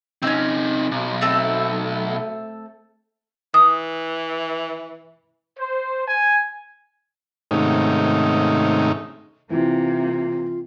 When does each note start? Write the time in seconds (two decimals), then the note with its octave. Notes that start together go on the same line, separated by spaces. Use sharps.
0.23 C3 C4 C#4 D#4
0.91 B1
1.21 A3 C4 A4
3.54 E3 D#6
5.59 C5
6.07 G#5
7.51 G#2 C3 D#3 A3 C#4 D#4
9.50 C3 E3 A#3 F4